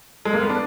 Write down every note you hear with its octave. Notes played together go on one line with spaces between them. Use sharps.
G#3
A#3
B3
D4